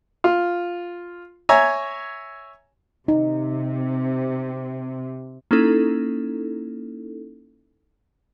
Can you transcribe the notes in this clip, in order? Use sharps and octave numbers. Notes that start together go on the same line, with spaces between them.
F4
C#5 E5 G#5 A#5
C3 D#4
A#3 C#4 D#4 E4 A4